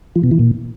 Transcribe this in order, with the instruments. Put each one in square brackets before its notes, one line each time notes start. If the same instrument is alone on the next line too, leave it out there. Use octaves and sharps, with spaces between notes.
[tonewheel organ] F3
B2
E3
A#2